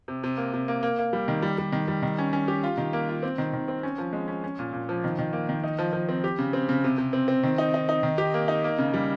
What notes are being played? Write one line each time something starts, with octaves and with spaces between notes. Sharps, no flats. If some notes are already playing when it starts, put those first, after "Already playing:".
C3
C3
A#3
C3
A#3
A#3
A#3
G3
D#3
G3
G3
D#3
G3
D#3
C#4
C#4
G4
F4
D#3
A#3
F4
C4
D#3
D#3
C4
C#4
F3
G#3
C#4
C#4
A#2
A#2
F3
D#3
D#3
A#3
D#3
D#4
F3
F3
C4
G4
C#3
C4
C#3
C3
C3
C4
C4
D#3
D#4
D#4
D#4
D#3
G4
A#3
D#4
A#3
C#3
G3